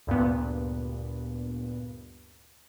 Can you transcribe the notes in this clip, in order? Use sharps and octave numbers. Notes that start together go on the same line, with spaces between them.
D2 G2 A#2 B3